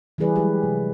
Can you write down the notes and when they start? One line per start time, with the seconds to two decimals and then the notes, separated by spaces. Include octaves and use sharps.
0.18 E3 G3 E4 G#4 B4 D5
0.35 F#3 G#3 G4 B4
0.63 C3